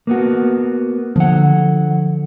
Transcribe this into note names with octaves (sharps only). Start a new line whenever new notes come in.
A#3 B3 F#4
D3 F3 F#5